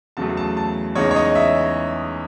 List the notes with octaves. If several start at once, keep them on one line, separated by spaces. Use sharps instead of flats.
E2 C#3 F#3 A3 A5
A5
A5
E2 C#3 G#3 D#4 C#5
C#5
D#5
E5